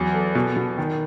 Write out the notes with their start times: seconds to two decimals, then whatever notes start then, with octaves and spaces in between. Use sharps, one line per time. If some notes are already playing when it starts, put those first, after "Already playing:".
Already playing: E2 F#3
0.14 A4
0.35 B2
0.57 B2
0.78 D#3